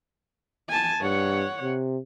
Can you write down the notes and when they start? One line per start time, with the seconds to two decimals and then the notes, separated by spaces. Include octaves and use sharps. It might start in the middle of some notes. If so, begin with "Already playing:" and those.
0.69 G#5 A5
1.01 G2 C#5 F#5
1.62 C3